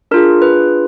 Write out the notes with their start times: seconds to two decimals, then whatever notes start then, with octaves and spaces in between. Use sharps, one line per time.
0.11 D4 F4 G#4 A#4
0.42 B4